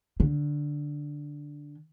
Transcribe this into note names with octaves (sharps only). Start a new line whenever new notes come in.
D3